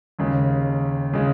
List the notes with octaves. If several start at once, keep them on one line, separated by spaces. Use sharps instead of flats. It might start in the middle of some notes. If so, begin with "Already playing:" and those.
D#2 C#3 G#3
C#3 G#3